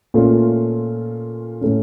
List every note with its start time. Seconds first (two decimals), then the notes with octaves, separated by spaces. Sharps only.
0.14 A#2 A3 C#4 F4
1.61 A2 A3 C#4